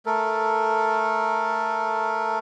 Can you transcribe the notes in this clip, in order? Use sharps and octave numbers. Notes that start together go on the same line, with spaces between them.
A3 A4 A#4